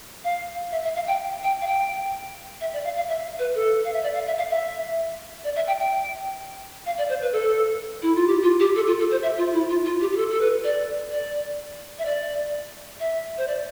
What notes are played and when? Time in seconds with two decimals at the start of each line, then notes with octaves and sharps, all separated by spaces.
0.24 F5
0.72 E5
0.84 E5
0.96 F5
1.07 G5
1.43 G5
1.62 F5
1.67 G5
2.61 E5
2.73 D5
2.85 F5
2.96 F5
3.08 E5
3.39 B4
3.55 A4
3.85 F5
3.93 E5
4.03 D5
4.14 F5
4.26 E5
4.38 F5
4.50 E5
5.44 D5
5.56 E5
5.67 G5
5.80 G5
6.86 F5
6.98 D5
7.09 C5
7.22 B4
7.33 A4
8.02 E4
8.15 F4
8.27 G4
8.43 F4
8.60 G4
8.76 A4
8.87 F4
8.99 A4
9.11 C5
9.23 E5
9.38 F4
9.53 E4
9.69 F4
9.85 F4
10.01 G4
10.12 G4
10.17 A4
10.30 A4
10.41 B4
10.64 D5
11.12 D5
11.99 E5
12.05 D5
13.00 E5
13.38 C5
13.47 D5